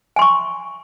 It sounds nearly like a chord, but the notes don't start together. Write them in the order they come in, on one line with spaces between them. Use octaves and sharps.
G#5 C6 C#6